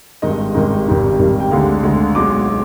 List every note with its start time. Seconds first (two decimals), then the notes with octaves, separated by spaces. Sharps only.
0.22 G#1 G2 D#3 G#3 D#5
0.54 G#1 G2 D#3 G#3
0.87 G#1 G2 D#3 G3
1.19 G#1 G2 D#3 G3
1.40 G5
1.51 D2 D3 G#3 F5
1.83 D2 D3 G#3
2.15 B1 B2 G#3 D6
2.49 B2